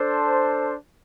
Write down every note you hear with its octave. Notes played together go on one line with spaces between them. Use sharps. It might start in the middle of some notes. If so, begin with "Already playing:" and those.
Already playing: D4 A4 C5